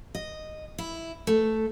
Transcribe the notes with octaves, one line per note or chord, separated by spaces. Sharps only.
D#5
E4
A3